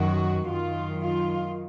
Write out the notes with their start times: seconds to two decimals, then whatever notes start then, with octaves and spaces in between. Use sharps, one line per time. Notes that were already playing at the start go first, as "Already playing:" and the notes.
Already playing: F#2 D#3 F#4
0.46 F#2 D#3 F4
1.01 F4